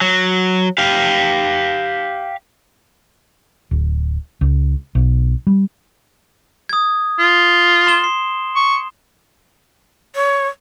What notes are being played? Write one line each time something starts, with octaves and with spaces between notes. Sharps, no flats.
F#3
G4 F5
D1
C#2
B1
G3
D#6 G#6
F4
C6 E7 G7
C7
C#6
C#5